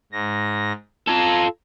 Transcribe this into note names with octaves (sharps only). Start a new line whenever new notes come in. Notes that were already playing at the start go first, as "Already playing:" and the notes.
G#2 A#6
F4 A4 A#5 G#6